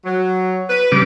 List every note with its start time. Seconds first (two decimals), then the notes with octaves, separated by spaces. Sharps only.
0.05 F#3
0.69 B4
0.92 C#3 G3 D6